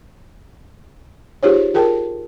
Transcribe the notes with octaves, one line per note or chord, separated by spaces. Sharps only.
D#4 F4 G4 G#4 C5 C#5
F4 G#4 A#4 G5 A5